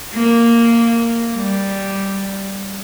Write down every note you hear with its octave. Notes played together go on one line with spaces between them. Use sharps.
A#3
G3